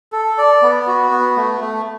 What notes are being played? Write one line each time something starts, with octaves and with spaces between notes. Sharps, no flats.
A4
D5
B3
F#4
B3
A3
A3